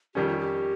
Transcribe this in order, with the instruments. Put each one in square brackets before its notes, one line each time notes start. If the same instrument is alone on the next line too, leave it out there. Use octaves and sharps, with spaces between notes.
[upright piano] F2 D#3 G3 C#4 [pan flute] G4
[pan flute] F4
G4